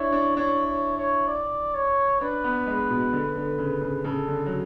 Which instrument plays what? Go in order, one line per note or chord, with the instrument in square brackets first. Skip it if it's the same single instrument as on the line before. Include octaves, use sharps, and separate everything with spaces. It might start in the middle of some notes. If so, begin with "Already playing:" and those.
Already playing: [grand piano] D4 E4 [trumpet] C#5
[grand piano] D4
[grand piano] D4 [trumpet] C#5
[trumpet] C#5
C#5
D5
C#5
[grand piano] D4 [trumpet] B4
[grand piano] B3
G#3
B2
D3
D3
C#3
C#3
[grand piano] C#3 [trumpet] A4
[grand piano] D3
F#3